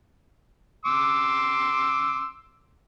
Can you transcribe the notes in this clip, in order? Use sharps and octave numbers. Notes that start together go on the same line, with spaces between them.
C6 D6 E6